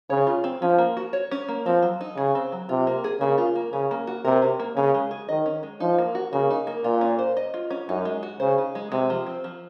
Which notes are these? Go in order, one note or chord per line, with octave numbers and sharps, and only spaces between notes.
C#3 C#5
F4
C4
F3 C#4
A#3
F#4
C#5
C#4
A#3
F3 C4
F#3
D#4
C#3 G#4
C4
F#3
C3 F4
A#3
G#4
C#3 A#3
F4
A#3
C#3 C#4
A#3
F#4
C3 A#4
C#4
A#3
C#3 C#4
G#3
G#4
D#3 D#5
C#4
G#3
F3 D#4
A#3
F#4
C#3 A#3
D#4
A#3
A#2 F4
C#4
C5
D#5
F4
C#4
F#2 D#4
G#3
F#4
C#3 C5
D#4
G#3
C3 G#3
F3
C4
F3